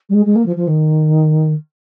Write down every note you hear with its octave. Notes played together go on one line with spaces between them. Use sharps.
G3
G#3
G#3
A#3
F3
F3
D#3